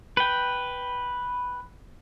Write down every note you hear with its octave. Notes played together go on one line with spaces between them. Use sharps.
B4 G5